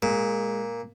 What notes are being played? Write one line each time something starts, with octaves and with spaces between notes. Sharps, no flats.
A#2 G#3